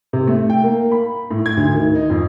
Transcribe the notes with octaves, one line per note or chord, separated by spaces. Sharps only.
C3
A3
G5
A#3
B5
A2
G#6
D2
D#3
D#4
F2